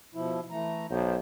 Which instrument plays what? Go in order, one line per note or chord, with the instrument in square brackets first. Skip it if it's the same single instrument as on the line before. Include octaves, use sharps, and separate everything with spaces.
[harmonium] B2 F3 E4
E3 A3 A#5
[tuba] B1 [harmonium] C5